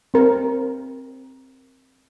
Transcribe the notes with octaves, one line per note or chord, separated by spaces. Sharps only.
C4 A#4